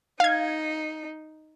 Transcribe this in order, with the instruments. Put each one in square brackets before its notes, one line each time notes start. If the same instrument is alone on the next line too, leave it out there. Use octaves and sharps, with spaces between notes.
[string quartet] D#4 [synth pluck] F5 G#6